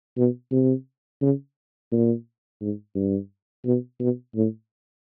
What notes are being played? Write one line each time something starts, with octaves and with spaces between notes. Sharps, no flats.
B2
C3
C#3
A#2
G#2
G2
B2
B2
A2